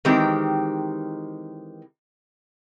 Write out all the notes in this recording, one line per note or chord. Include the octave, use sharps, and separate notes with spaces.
D#3 E3 G#3 C4 G4 A#4